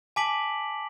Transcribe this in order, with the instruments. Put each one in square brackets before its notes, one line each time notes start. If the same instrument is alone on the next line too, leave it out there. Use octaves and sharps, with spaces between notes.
[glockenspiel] G#5 A5 D6 B6 D7 F#7